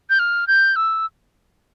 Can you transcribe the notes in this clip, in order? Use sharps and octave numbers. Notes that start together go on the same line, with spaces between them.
G6
F6
G6
E6